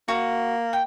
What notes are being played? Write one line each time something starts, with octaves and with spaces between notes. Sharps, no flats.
A#3 F#4
G5